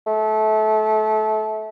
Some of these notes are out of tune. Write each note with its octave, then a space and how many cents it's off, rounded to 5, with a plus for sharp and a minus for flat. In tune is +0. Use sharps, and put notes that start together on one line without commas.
A3 -25